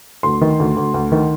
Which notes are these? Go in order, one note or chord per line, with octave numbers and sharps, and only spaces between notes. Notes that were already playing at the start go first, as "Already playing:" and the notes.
D2 C6
D#3
D2
D2
D2
D#3